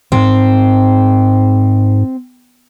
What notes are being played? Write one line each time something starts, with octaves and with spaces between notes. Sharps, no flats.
G#2 C4